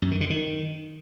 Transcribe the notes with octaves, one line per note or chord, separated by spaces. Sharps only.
F#2
D#3
D3
D#3